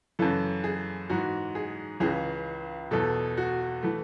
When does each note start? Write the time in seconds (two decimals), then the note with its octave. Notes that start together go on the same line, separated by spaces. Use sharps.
0.19 F#2 C#3 E3 A4
0.64 G#4
1.10 G#2 E3 F#4
1.55 G#4
2.00 C#2 C#3 E3 G#4
2.91 E2 B2 A4
3.37 F#4
3.83 E3 A3